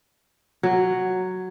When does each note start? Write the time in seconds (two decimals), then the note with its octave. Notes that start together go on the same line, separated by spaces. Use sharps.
0.63 F#3